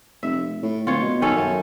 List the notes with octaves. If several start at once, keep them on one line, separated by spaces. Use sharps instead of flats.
F1 E5
A2
D1 F4 C#5
B2
D#3 C#4 A4
F#2